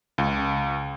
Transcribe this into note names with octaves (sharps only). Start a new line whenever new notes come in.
C#2